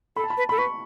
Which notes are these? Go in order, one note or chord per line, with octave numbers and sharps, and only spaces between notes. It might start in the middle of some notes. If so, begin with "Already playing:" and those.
A4 B5
A5
B5
B4
A4 B5
B4 C#6